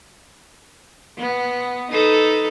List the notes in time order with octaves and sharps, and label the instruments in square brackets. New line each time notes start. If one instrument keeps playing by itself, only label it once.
[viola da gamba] B3
D#4 A4 B4